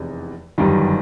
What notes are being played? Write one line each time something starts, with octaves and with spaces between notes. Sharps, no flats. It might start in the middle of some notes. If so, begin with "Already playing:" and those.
Already playing: F1 E2 C3
G1 F#2 D#3 G3